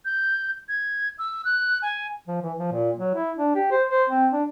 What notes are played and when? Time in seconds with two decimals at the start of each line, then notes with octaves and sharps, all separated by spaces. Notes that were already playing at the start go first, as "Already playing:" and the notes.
0.05 G6
0.69 G#6
1.19 E6
1.45 F#6
1.82 G#5
2.28 F3
2.42 E3
2.58 F3
2.71 A#2
2.98 F#3
3.15 E4
3.37 D4
3.55 G4
3.71 C5
3.90 C5
4.09 C4
4.32 D4